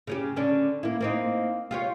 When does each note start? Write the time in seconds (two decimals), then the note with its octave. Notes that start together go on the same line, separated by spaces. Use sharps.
0.07 C#3 C#4 G4
0.36 D3 C#4 D4
0.83 A#3 E4
1.00 A#3 C4 D#4
1.71 F4 G4 C#5